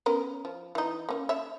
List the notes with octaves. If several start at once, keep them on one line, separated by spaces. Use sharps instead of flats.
B3 C#4 A#4
F3
E3 D#4
A#3 C#4
C#5 E5